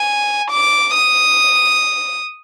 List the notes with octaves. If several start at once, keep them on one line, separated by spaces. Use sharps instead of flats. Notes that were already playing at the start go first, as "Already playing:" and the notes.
Already playing: G#5
D6
D#6